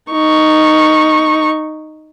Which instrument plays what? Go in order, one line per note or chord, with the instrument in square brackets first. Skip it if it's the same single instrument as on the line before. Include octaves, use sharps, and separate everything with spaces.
[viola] D#4 C#6